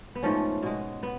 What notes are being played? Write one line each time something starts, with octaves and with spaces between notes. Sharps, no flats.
B3
G#2 F3 A3 C#4
B2 G#3
B3